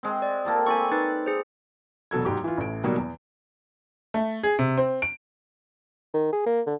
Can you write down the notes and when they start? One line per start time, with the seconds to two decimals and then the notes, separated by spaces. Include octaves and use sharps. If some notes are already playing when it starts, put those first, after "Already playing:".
0.03 G#3 C4
0.22 D5
0.45 A#3 G4 A4
0.66 C4 D5 G#5 B5 C#6
0.92 D#4 B4 A6
1.26 G#4 C5
2.11 E1 B2 F#3 A4 G#6
2.25 G#2 F#3 G4 D6
2.44 E3 F4
2.58 A1 A2 D7
2.83 B2 D#3 F#3 G3 A#3 G4
2.97 E2
4.14 A3
4.43 G#4
4.59 C3
4.77 C4
5.02 D7
6.14 D#3
6.33 G#4
6.46 A#3
6.67 D3